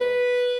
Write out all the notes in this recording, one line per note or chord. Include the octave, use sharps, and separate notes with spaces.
G#2 B4